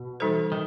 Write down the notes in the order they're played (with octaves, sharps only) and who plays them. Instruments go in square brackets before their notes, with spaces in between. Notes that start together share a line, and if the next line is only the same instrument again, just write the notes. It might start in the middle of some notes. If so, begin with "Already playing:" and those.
Already playing: [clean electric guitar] B2
[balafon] E3 G3 D#4 A4 C5
[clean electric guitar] D#3